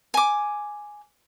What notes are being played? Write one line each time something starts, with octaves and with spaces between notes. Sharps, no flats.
G#5 D6